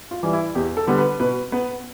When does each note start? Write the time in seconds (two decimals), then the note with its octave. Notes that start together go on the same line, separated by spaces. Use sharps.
0.11 F4
0.23 E3 G3
0.33 E4
0.55 E2 G4
0.77 A4
0.87 D3 G3 B3
0.98 B4
1.20 B2 B4
1.52 B3 B4